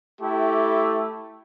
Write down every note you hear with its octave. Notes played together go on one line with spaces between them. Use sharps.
A3 E4 G4